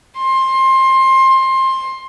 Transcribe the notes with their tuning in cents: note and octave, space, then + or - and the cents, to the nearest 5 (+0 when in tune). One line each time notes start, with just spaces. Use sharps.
C6 +20